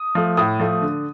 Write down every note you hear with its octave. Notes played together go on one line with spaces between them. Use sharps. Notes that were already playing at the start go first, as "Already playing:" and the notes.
Already playing: D#6
F3 A3
A2 D#6
F3 A3
D3